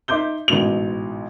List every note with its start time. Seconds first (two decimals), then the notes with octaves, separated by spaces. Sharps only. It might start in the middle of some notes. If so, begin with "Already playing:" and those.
0.08 D#4 E5 C6 D6 G6 G7
0.48 A1 G#2 B2 F7